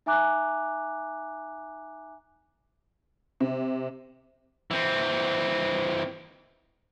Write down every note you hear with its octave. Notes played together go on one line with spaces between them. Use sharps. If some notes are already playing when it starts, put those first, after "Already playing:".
D#4 E5 G#5 A#5 D6 F#6
C3
E3 C4